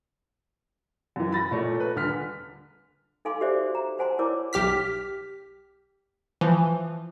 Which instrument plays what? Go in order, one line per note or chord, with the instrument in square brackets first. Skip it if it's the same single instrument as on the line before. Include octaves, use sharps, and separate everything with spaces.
[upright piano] F#2 E3
B5 A6 A#6
A#2 A3 C#5
B4
D#1 D3 F6 B6
[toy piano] D#4 A4 F5 G#5 C6 D6
F#4 G4 C5 D5 E5 D6
A#5
C5 F#5 G#5 A5 C6
E4 A#4 C#5 D5 D6
[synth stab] B1 G4 F6 B6
E3 F3